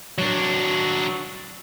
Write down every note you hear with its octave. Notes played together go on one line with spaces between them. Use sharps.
F#3 D4